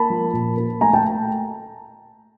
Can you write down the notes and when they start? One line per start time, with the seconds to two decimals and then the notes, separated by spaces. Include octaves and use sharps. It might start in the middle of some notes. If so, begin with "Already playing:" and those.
Already playing: A#3 A5 B5
0.10 F3
0.33 A#2
0.57 A#3
0.81 A3 G#5 A#5
0.93 G5 A5